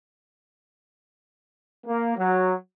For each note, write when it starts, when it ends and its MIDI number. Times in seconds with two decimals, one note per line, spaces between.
1.87 2.14 58
2.18 2.54 54